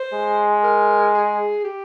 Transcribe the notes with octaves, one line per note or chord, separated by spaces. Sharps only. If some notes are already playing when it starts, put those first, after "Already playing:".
Already playing: C5
G#3
A#4
G#4
G4